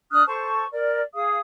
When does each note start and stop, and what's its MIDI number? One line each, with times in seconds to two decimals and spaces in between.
0.11 0.23 62
0.11 0.23 87
0.11 0.23 89
0.11 0.23 90
0.26 0.65 69
0.26 0.65 72
0.26 0.65 81
0.26 0.65 85
0.72 1.00 70
0.72 1.00 74
1.14 1.38 68
1.14 1.38 77
1.14 1.38 87